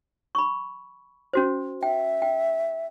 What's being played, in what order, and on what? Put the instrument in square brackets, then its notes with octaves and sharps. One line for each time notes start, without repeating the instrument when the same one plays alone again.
[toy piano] B5 C#6
C#4 F#4 C5
[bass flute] E5 [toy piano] G5
[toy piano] G5